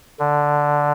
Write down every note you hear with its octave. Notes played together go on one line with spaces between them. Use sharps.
D3